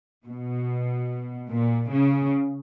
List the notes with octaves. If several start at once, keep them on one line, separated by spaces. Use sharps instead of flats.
B2
A#2
C#3